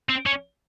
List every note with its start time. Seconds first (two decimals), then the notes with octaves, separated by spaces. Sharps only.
0.09 C4
0.26 C#4